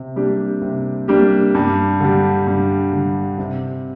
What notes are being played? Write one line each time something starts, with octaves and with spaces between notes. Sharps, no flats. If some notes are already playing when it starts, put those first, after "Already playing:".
Already playing: C3
G3 A#3 D4 G4
C3
G3 A#3 D4 G4
G2
D3 G3
G2
D3 G3
C3